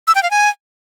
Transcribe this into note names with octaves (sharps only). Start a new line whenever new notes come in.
E6
G5
F5
G#5